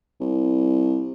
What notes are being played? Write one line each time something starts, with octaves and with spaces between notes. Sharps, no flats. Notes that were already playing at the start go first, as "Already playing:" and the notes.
C2